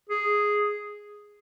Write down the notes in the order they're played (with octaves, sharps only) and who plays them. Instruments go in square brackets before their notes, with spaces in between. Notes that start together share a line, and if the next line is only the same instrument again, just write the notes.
[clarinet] G#4